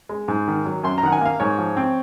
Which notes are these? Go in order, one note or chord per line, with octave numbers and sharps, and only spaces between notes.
G#3
G#2
D#3
F#3
F#2 C6
A#5
D#3 F#5
G#5
A#3 F5
G#2 C#5
F3
C4